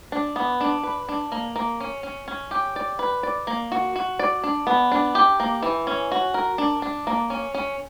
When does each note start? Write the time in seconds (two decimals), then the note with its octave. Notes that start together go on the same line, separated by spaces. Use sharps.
0.12 D4
0.36 B3
0.61 D4
0.83 B4
1.09 D4
1.32 A#3
1.56 A#3
1.80 C#4
2.03 C#4
2.28 C#4
2.51 G4
2.76 D5
2.99 B4
3.23 D5
3.47 A#3
3.72 F#4
3.96 F#4
4.19 D5
4.43 D4
4.67 B3
4.92 D4
5.15 G4
5.40 A#3
5.63 E3
5.87 C#4
6.12 F#4
6.34 A#4
6.58 D4
6.82 D4
7.07 A#3
7.30 C#4
7.54 C#4